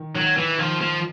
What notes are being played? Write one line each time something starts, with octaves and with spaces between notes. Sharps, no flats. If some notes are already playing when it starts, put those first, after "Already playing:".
Already playing: D#3
D#3 F#3
E3
D#3 F3
F3